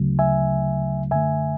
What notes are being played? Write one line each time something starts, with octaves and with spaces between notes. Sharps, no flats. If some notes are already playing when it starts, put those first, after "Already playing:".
Already playing: D2 C#3 F#3 A3
E5 G#5
F#2 D3 A3 E5 G#5